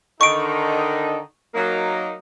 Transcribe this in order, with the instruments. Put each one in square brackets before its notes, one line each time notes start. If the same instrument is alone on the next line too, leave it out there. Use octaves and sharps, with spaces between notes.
[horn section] D3 D#3 D#4 [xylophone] C#6 D7
[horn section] F#3 A#3 D#4